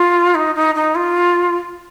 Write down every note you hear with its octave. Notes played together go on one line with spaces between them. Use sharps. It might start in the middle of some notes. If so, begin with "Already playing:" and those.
Already playing: F4
D#4
D#4
D#4
F4